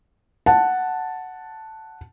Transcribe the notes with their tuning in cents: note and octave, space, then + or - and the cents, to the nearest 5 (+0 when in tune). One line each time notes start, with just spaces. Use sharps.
F#5 +0 A5 +0